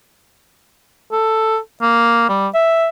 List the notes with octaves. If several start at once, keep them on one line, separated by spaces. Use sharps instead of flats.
A4
A#3
G3
E5